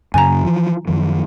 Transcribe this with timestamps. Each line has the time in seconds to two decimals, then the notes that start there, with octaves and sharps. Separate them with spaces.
0.14 F#2 C#3 G#5 A#5
0.45 E3 F3
0.87 F#2 D#3 F3